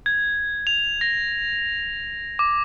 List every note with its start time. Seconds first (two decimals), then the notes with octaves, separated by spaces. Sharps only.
0.06 G#6
0.67 F7
1.01 A#6
2.39 D6